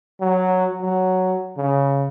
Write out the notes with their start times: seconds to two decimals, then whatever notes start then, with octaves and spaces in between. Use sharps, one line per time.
0.21 F#3
0.82 F#3
1.57 C#3